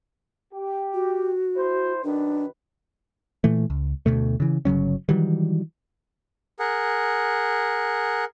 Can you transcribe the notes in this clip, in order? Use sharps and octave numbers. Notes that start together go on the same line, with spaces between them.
G4
F#4
E4 C5
F#2 D#3 D4 B4
A#2 E3 A3
C#2
D2 B2 A3
C#3 E3
G1 C#3 F#3 C#4
D#3 E3 F#3 G3
G#4 A#4 F#5